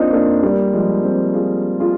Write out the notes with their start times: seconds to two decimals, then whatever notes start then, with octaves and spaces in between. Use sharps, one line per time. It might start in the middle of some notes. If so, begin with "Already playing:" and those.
Already playing: A#3 C4 D4 D#4 F4
0.13 A#3 D4
0.43 G3 A#3
0.73 F3 G#3
1.03 G#3 C4
1.34 F4 G#4
1.80 F4 G#4